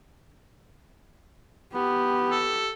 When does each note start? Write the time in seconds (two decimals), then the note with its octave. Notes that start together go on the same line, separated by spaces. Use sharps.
1.74 B3 G4
2.31 A4